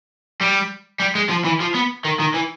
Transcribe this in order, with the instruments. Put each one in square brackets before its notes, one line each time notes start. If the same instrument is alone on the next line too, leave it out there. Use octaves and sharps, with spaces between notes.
[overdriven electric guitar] G3
G3
G#3
F3
E3
F3
B3
D#3
D#3
E3